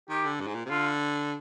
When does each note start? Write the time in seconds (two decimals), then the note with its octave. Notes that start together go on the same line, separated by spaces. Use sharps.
0.10 D#3 G4
0.25 D3
0.40 G2
0.47 G#2
0.55 A#2
0.66 C3
0.70 D3 F4